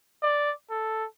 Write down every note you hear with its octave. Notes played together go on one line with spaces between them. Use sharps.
D5
A4